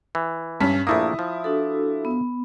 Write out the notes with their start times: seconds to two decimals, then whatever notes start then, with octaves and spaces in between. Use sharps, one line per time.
0.15 E3
0.60 G2 C#4 B6
0.87 A#1 A3 A#3 E4 D#6
1.19 F3
1.44 D4 F#4 A4
2.05 B3